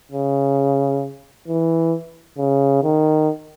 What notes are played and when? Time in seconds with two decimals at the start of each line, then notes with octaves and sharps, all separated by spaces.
0.12 C#3
1.48 E3
2.38 C#3
2.83 D#3